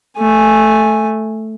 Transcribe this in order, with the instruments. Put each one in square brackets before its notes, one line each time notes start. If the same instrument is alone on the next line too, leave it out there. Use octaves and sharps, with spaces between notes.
[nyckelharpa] A3 G#5